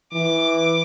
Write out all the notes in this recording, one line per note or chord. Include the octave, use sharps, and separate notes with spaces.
E3 D6